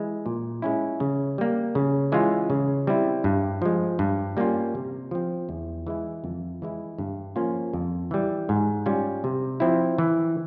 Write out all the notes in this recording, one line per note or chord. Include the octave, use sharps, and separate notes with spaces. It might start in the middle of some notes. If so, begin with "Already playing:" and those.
Already playing: E3 G#3 E4
A#2
G#3 C#4 E4
C#3
G3 A#3
C#3
E3 G#3 C#4 F4
C#3
G3 C4 E4
G2
F3 G#3
G2
G3 A#3 C#4 F4
C3
F3 C4
E2
E3 G#3 E4
F2
E3 G#3 E4
G2
F3 A#3 C#4 F4
F2
E3 G3
G#2
G3 C#4 F4
C3
F3 C4 E4
E3